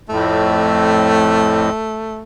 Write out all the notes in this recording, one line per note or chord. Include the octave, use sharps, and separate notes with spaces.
F2 A2 A3